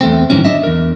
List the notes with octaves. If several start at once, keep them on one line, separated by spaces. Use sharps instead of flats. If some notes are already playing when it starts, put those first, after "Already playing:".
E2 A3 C4
G#2 D#3 E3 F#3 C#4
D4 D#5 E5
E2 A#4